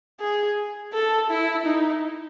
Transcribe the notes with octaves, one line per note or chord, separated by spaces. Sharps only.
G#4
A4
E4
D#4